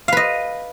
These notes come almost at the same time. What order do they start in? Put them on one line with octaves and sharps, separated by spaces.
F5 B4 D#5